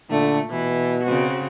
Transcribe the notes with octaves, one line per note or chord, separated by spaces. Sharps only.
A#2 D3 A3
B2 E3
C#3 C4 F#4